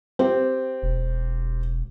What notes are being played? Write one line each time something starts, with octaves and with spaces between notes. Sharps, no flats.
C4 G4
E1